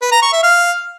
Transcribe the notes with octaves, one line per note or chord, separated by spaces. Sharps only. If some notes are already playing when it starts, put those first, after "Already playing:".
B4
A#5
C#6
E5
F5